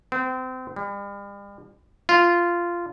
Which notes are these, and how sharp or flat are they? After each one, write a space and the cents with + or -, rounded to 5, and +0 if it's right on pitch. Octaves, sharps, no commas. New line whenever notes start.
C4 -30
G3 +40
F4 -10